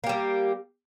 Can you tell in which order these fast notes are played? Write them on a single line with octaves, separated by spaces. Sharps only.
A#3 G4 G3